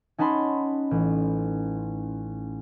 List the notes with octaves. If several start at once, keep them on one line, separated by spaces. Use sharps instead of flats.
C#4 D#4 F#5 A5 B5 C6
A1